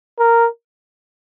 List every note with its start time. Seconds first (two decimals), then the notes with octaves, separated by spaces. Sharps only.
0.19 A#4